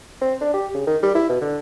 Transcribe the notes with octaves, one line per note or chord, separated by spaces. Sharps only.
C4
D4
G4
C#3
D#3
G3
E4
B2
D3